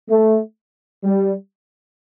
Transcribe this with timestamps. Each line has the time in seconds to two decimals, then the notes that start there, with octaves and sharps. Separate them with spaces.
0.09 A3
1.04 G3